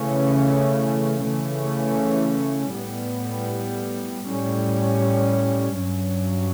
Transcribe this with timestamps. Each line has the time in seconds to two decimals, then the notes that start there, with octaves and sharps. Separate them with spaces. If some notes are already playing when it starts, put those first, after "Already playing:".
Already playing: C#3 E3 A3 C#4
1.21 C#3 E3 A3 C#4
2.72 A2 G3 B3
4.23 A2 G3 C#4
5.75 G2 F#3 C#4